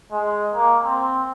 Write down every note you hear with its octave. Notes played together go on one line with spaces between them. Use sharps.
G#3
A#3
C4